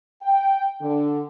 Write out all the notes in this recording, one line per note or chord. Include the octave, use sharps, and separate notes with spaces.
G5
D3